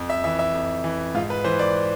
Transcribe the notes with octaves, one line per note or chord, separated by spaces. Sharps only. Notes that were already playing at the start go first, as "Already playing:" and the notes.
Already playing: F2
E5
E3 E5
E5
F2
E3
G#2 F4
B4
E3 C5
D5